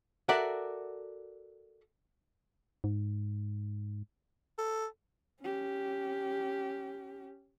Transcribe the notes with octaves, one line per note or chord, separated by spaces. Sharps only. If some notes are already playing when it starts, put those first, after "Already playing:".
F#4 A4 A#4 D5 E5 F#5
G#2
A4
C#4 G4